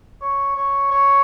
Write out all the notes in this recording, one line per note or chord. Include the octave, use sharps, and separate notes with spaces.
C#5
C#5
C#5